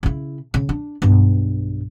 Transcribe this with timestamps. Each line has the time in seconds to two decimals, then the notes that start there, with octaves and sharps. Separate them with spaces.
0.03 C#3 E4
0.54 C#3
0.69 D4
1.02 B1 G2